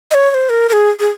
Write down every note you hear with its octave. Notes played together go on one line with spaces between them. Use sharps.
D#5
C#5
C#5
C5
A#4
A#4
G#4
G#4